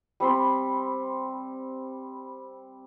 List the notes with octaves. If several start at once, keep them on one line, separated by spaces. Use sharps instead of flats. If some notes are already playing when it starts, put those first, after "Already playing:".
G3 C4 B5 C6